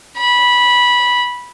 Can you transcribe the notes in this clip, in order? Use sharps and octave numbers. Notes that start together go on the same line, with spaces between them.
B5